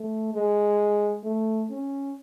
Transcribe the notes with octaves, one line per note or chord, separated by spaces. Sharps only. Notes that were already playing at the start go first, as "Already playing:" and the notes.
Already playing: A3
G#3
A3
C#4